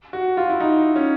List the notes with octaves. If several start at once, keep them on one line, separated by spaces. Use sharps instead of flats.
F#4
F4
E4
D#4
C#4